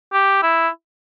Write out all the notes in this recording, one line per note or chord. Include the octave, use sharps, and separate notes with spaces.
G4
E4